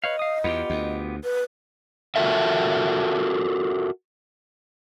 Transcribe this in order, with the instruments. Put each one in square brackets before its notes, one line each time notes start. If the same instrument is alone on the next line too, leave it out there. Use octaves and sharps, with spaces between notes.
[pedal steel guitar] B4 C#5 F5 [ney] D#5
[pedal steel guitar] F5 D#6
[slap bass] E2 [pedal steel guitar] B3 F4 G4
[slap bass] D2
[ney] B4
[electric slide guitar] F4 F#4 A4 A#4 E5